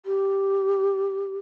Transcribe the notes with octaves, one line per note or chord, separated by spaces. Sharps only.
G4